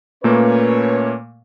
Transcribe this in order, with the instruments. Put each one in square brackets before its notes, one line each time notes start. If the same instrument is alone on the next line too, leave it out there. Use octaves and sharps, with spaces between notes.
[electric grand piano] A#2 A3 A#3 [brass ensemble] C#4 B4 C#5